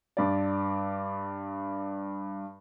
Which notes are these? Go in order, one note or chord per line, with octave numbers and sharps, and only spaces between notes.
G2 D5